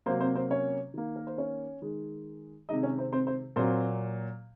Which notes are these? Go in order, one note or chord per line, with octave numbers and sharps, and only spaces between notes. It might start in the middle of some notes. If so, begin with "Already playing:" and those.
C3 F#3 A#3 C4 C5
C4 C5
C4 C5
C#4 C#5
D#3 A#3
A#4
C5
C#4 C#5
D#3 G#3
C3 D#3 G#3 D#4 D#5
C#4 C#5
C4 C5
C4 C5
C4 C5
A#2 F#3 A#3 C4 C5